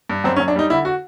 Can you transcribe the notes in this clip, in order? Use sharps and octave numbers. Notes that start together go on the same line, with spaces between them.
G2
F#2 C4
C#4
F#2
D4
G3 D#4
D3 E4
F#4